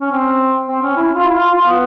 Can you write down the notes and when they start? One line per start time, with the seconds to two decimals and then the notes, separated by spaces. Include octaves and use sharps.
0.01 C#4
0.12 C4
0.68 C4
0.82 C#4
0.97 E4
1.15 F4
1.24 E4
1.31 F4
1.53 F4
1.67 B3